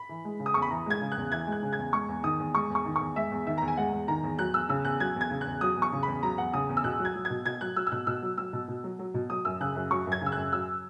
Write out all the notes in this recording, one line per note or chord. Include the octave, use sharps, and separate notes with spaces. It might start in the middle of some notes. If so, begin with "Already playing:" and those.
Already playing: B5
E3
G#3
C#3
D#6
E2 C#6
B5
E3 A#5
G#3 G#6
C#3
F#6
E2
E3 G#6
G#3
F#6
C#3
G#6
E2
G#3 C#6
E2
D#3 D#6
E2
G#3 C#6
E2
C#6
D#3
C#6
E2
G#3 E5
E2
D#3 E5
E2 A#5
G#5
G#3 F#5
E2
D#3 A#5
E2
F#3 F#6
E2 E6
C#3 E6
E2 F#6
F#3 G#6
E2 G#6
C#3
E2 F#6
F#3 D#6
E2
C#6
C#3
E2 B5
F#3 A#5
E2 F#5
C#3 D#6
E2
E6
B2 F#6
F#3
G#6
F#3
G#6
B2
B2 G#6
F#3 F#6
F#3 E6
E6
B2 F#6
B2 E6
F#3
F#3 E6
B2
B2
F#3
F#3
B2
F#3 D#6
F#2 E6
C#3 F#6
F#2
F#3 C#6
F#2
G#6
C#3 E6
F#2 F#6
F#3 E6